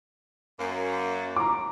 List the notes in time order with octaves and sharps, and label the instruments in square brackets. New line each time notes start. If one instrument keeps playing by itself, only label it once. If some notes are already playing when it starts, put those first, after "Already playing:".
[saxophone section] F#2 A#3
[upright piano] A#5 D6